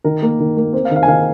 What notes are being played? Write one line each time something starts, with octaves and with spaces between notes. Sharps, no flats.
D#3 A#4
A#3
D#3
A#3
C4 C5
F5
D#3
F5
G#5
D#3 F5